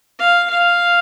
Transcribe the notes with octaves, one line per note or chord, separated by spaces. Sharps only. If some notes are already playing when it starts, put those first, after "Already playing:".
F5
F5